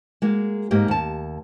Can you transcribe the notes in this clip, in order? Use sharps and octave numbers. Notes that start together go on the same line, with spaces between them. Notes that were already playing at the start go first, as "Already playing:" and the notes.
G#3 A#3 F#4
G#2 A#3 G4
D#2 A5